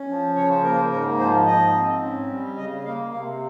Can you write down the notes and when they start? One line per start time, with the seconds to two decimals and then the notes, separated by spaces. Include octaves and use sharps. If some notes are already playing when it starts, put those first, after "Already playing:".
Already playing: C#4
0.08 F3
0.36 C#3 C#5
0.49 C5
0.63 A#3 A#4
0.76 C5
0.91 G#2 A#4
1.19 F3 C5
1.46 G#2 D#5
1.74 C4
2.02 C#4
2.29 G3
2.57 C#3 D#5
2.85 A#3 F5
3.12 C3 F5